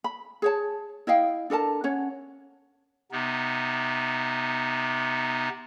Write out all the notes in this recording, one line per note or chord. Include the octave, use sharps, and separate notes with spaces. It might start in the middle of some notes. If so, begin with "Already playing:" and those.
B5
G#4 C#5 A5
E4 D#5 F5 G5
D4 A4 A#4 A5
C#4 C#5 F#5
C3 B3 D#4